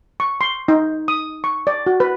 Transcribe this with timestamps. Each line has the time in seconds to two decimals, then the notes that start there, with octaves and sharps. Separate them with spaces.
0.20 C#6
0.41 C6
0.68 D#4
1.08 D#6
1.44 C#6
1.67 D5
1.86 F#4
2.00 B4